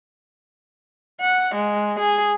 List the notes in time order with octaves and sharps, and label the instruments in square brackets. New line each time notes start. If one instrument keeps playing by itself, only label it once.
[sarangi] F#5
G#3
G#4